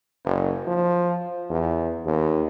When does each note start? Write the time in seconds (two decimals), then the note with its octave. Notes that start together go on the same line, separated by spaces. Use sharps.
0.25 F#1
0.68 F3
1.50 E2
2.06 D#2